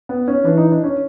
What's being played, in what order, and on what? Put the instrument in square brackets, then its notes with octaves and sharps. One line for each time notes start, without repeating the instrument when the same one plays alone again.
[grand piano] B3
C#4
[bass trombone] E3 [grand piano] D4
[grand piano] D#4
D4
C#4